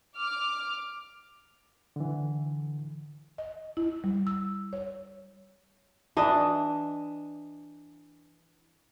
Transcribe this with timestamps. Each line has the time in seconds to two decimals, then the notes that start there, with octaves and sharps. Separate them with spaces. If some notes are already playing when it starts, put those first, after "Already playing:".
0.16 D6 F6
1.96 D3 E3
3.38 D#5
3.77 E4
4.04 G3
4.27 E6
4.73 C#5
6.17 E3 D4 D#5